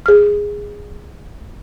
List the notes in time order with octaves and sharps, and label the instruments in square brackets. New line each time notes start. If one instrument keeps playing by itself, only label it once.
[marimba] G#4 F6